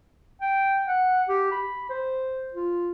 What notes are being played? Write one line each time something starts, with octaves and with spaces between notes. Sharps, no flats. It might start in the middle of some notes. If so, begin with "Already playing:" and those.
G5
F#5
G4
B5
C5
F4